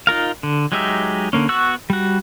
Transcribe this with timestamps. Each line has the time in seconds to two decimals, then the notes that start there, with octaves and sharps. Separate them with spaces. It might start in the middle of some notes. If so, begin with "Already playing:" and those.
0.07 D#4 F4 A#4 F5
0.43 D3
0.72 F#3 G#3 D#4 G4 E5
1.33 D3 A#3 C#4
1.49 B3 F#4 F#5 C#6 E6
1.90 G3 F#4